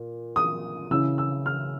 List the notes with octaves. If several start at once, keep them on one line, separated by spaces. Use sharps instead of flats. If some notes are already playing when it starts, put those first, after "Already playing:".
Already playing: A#2
D#6
C#3 E3 E6
E6
F6